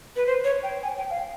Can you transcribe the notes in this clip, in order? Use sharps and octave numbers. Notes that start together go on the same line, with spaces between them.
B4
C5
C#5
G5
G#5
G5
F5